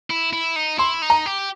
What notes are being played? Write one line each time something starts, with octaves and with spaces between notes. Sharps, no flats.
E4
E4
D#4
E4 C6
D#4
A#5
G4